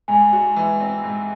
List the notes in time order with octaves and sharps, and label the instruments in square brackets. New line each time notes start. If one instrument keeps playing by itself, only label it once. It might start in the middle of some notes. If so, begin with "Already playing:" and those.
[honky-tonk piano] G#2 [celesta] G#5
[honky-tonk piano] F#4
E3
C4
G#2